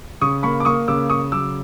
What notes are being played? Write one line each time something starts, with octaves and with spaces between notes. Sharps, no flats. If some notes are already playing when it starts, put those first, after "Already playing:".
C#3 C#6 D#6
A#3 B5 C#6
D6
A#3 C#6 D#6
C#3 D6 E6
C#3 C#6 D#6
F#3 D6 E6